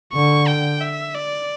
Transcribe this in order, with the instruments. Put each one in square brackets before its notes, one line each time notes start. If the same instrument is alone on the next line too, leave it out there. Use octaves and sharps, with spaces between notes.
[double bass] D3 [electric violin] C#6
[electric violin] G5
E5
D5